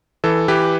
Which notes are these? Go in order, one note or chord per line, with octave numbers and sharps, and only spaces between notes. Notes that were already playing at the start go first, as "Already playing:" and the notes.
E3 A4
E3 G4 B4